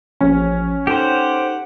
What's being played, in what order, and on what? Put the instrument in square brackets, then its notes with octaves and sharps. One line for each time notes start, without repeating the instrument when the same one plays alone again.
[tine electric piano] A1 F3 [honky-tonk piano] C#4
[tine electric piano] D#4 A4 [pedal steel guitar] G4 C5 [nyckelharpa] F#5